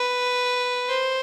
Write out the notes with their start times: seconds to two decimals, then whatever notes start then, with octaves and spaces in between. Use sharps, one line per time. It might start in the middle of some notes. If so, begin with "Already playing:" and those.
Already playing: B4
0.88 C5